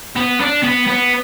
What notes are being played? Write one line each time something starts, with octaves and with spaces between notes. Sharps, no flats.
B3
D4
B3
B3